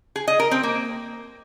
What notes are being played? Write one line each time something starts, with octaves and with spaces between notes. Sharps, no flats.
G#4
D#5
A#4
C4
A#3